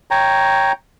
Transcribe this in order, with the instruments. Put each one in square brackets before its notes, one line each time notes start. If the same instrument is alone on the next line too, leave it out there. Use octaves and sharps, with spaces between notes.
[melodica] C#5 G5 A#5